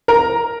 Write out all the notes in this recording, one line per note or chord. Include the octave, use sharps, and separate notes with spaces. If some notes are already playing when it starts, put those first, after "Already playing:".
A#4 A#5